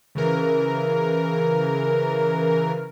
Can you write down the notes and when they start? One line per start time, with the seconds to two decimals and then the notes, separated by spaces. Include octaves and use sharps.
0.15 C#3 E3 A#4